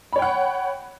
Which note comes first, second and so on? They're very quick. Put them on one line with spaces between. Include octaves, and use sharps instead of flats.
B5 C#5 G5 F#5